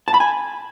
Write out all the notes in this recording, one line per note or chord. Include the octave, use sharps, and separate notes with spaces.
A5
B5
G#5